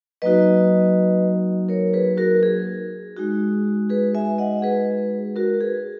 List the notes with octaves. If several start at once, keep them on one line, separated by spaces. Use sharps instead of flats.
F#3 A#3 D#4 F#4 B4 D#5
A#4 C#5
G#4 B4
F#4 A#4
G#4
G#3 D#4 F#4
G#4 B4
E5 G#5
D#5 F#5
G#4 B4
F#4 A#4
G#4 B4